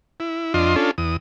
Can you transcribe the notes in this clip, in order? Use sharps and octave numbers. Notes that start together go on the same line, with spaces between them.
E4
F2 D4 F4 D#5 C6
C#4 D4 F4 A4
E2 D#6